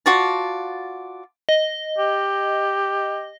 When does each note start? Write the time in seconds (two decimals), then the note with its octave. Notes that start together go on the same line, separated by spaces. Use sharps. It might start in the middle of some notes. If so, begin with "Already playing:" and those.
0.06 F4 F#4 D5 A5
1.49 D#5
1.98 G4